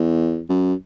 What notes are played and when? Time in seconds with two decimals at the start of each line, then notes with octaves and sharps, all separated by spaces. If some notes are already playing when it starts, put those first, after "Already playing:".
Already playing: E2
0.49 F#2